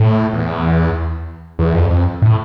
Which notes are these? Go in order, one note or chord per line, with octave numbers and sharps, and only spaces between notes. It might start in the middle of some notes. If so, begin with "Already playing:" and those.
Already playing: A2
E2
E2
F2
F2
A2